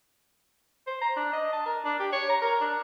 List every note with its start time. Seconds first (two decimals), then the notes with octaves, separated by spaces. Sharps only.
0.87 C5
1.01 A#5
1.16 D4
1.33 D#5
1.53 A5
1.66 A#4
1.85 D4
2.00 G4
2.12 C#5
2.29 A#5
2.42 A#4
2.61 D4